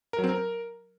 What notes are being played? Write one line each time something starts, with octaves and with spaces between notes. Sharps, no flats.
A#4
F#3
C4
A#4